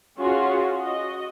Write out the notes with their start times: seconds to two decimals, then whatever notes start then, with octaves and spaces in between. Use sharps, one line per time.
0.18 C#4 F4 F#4 G#4
0.81 F#4 D#5